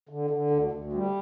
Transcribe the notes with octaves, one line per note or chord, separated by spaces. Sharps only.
D3
D3
D2
D2
G3